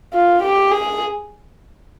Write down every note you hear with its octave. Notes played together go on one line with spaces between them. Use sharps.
F4
G4
G#4